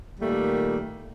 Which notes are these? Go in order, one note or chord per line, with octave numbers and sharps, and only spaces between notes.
A#2 D#3 G3 A3 A#3